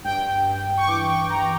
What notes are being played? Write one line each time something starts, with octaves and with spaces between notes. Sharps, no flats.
G2 G5
G2
C#6
E3 D6
C#6
G2 A#5